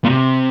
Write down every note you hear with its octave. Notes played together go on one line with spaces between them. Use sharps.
A#2
C3